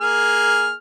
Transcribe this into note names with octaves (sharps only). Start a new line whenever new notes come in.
A#3 G#4 F6